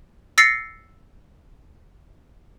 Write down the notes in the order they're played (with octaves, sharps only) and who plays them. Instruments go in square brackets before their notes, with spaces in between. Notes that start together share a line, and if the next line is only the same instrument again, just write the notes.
[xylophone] E6 A6 A#6 C7 C#7